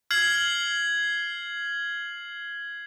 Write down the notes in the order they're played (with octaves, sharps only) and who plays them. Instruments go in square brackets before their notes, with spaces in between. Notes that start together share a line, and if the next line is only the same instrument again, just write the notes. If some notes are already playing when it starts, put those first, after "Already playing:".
[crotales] F6 G#6 C7 F#7